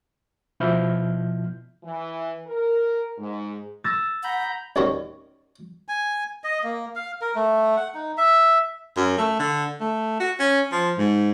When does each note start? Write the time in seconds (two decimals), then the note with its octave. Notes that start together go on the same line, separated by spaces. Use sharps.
0.60 B2 F3 E4 F6 G6
1.84 E3
2.46 A#4
3.18 G#2
3.84 E6 A6 A#6
4.24 F#5 A#5 B5 G6
4.76 A1 D#2 D3 G3 C#4 F#4
5.88 G#5
6.44 D#5
6.63 A#3
6.95 F5
7.21 A#4
7.35 A3
7.76 F#5
7.94 D#4
8.17 E5
8.97 F#2
9.18 A3
9.39 D3
9.80 A3
10.20 F#4
10.40 C#4
10.72 F3
10.98 G#2